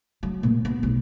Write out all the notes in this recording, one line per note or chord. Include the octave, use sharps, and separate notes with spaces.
F#3
A#2
B3
B1